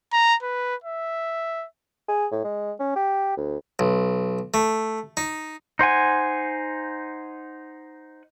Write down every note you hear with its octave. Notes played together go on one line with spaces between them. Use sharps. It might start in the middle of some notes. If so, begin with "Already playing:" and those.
A#5
B4
E5
G#4
A2
G#3
C#4
G4
D2
B1
A3
D#4
D#4 C5 F#5 G#5